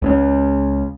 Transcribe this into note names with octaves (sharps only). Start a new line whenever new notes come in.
C#2 C4 C#4